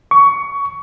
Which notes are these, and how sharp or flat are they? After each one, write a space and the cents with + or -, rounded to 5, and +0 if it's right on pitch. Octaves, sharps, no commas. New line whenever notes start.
C#6 +20